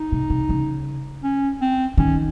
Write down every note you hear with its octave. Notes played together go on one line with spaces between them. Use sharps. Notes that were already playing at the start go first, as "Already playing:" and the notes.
Already playing: D#4
C3
C3
C#3
C#4
C4
D#3 C#4